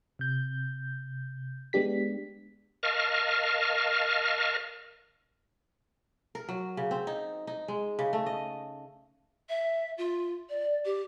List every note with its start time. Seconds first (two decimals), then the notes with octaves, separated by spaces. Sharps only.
0.19 C3 G6
1.73 G#3 B3 D4 G4 B6
2.83 A#4 D#5 F5 A5 C#6 F6
6.35 A#4
6.49 F#3
6.77 C#3
6.91 C4
7.07 D#4
7.47 D#4
7.68 G#3
7.99 C#3
8.13 A3
8.26 D#5
9.49 E5
9.98 F4
10.49 D5
10.85 G4